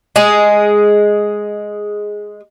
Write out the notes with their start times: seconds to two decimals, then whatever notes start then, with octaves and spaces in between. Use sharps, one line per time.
0.16 G#3 G#4